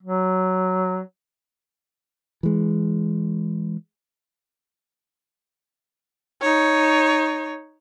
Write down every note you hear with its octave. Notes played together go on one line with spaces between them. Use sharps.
F#3
E3 G#3
D#4 C#5